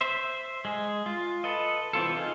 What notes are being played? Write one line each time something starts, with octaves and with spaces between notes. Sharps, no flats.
C5 E5
G#3 G#4
F4
A4 B4 D#5
E3 C4 F4 A4
D#4 F4 G#4